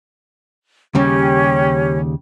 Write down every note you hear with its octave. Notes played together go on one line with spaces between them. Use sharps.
D#2 C#3 G3 C#4 G4